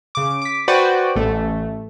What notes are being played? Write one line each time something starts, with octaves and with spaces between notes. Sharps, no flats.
C#3 D6
D6 B6
F#4 B4 C5 D5 F#5 G5
A1 A3